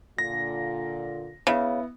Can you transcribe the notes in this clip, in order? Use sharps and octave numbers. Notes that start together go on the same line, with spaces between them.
A#2 D3 F4 A#6
C#3 B3 E4